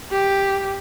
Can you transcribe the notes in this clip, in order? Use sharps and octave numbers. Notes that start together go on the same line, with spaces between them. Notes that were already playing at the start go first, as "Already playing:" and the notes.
G4